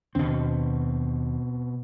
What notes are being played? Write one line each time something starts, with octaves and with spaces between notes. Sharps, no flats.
D#2 B2 D#3 C4 D4